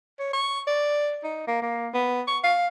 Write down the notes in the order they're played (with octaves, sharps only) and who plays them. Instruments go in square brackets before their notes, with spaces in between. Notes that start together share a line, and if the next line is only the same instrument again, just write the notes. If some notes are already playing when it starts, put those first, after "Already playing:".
[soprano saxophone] C#5
C#6
D5
D#4
A#3
A#3
B3
C#6
F5